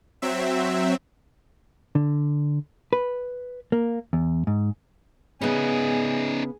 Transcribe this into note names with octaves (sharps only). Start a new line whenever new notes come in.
F#3 C4 E5
D3
B4
A#3
E2
G#2
C#3 B3 C#4 D#4 G#4